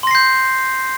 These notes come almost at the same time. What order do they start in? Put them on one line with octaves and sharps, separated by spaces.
C6 A#6 C7 G6